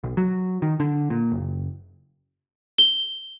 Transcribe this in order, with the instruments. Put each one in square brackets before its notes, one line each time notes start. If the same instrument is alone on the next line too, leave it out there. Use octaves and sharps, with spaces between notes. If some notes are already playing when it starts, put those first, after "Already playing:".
[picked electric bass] B1
F#3
D#3
D3
A#2
F#1
[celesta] G7